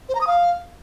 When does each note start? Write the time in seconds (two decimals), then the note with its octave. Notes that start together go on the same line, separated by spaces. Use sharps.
0.09 C5
0.15 A#5
0.21 D#6
0.27 F5